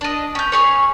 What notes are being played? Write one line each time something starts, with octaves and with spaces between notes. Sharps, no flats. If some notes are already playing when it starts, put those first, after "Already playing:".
D4 D#5
C#4 G6
C#4 G#4 C#5